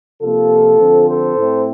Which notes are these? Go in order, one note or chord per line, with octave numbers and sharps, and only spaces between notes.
C3 F3 A#3 F4 A4
D3 F3 C4
A4 C5
A2 A3 C4